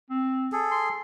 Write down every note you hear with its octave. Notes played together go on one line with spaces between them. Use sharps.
C4
G#4 A4
C6